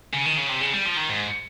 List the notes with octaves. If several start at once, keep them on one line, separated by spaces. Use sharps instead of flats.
C#3
D#3
C#3
C3
C#3
G3
F3
D#3
G#2